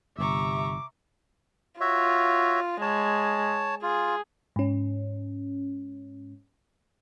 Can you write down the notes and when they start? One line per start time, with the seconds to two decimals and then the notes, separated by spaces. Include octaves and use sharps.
0.18 G1 C3 E5 A#5 C#6 D6
1.81 F4 F#4 C#5 E5
2.81 G#3 C#5 A5
3.83 F4 G#4
4.56 G#2 C#4